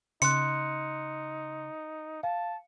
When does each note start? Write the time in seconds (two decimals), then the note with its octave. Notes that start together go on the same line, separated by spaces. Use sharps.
0.22 C#3 D#4 C6 F#6 C#7
2.23 F5 A5